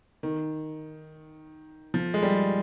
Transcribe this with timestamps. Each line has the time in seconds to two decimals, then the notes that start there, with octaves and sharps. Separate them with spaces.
0.23 D#3
1.94 F3
2.14 G#3
2.23 G3